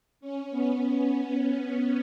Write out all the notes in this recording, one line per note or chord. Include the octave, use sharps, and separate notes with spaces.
C#4
B3